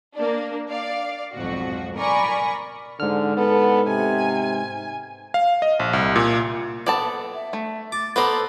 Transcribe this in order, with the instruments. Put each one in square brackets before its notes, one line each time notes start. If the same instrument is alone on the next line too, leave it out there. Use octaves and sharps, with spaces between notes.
[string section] A#3 D4
D5 F5
B1 F2 G#2 F#4
A#4 D5 G#5 B5 C#6
[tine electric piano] G#2 F6 [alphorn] D3
[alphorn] B3 [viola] A4
[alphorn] C3 [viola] G#5
[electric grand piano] F5
D#5
A#1
C2
A#2
[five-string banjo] B3 A4 A5 [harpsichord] D5
[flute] E5
[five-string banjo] A3
[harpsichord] D6 [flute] A6
[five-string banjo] B3 A#5 [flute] A4 [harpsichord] B4 C5 D5